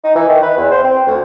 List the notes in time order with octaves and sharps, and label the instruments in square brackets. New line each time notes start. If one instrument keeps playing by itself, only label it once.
[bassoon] D#4
E3
D#3
B4
E2
C5
C4
D2